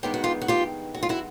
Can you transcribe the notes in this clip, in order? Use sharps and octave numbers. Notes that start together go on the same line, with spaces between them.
G2 D#3 G#3 B3 G4
F#4
F4 G4
F#4
F4 G4
F#4
F4
E4 F#4